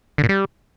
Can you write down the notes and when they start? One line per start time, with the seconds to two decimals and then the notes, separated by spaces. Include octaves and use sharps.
0.18 D3
0.24 A#2
0.29 G3